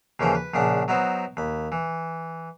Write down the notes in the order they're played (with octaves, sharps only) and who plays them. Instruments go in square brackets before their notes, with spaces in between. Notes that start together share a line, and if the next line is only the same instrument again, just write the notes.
[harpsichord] D#2 C#3 E3 F3 G5
B4
A#1 C#3 D4 F#5
F#3 B3 D#4 E4 C5
D#2 B5
E3